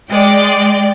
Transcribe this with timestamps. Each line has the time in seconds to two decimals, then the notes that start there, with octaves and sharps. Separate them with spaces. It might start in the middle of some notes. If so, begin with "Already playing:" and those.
0.11 G#3 D5 G5